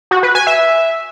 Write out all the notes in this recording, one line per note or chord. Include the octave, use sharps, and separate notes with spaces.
F#4
B4
G#5
E5